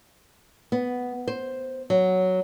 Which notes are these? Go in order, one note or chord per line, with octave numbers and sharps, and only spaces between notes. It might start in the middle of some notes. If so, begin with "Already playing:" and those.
B3
C5
F#3